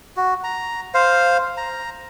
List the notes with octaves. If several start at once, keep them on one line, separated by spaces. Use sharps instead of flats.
F#4
A#5
C5 F5
A#5